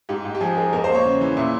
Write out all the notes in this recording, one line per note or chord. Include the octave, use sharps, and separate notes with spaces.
G#2 G4
G#2
G4
F3 G#4
G#3 A#4
E2 A#4
C5
A#3
C#5
C#3
E3
A#2 E5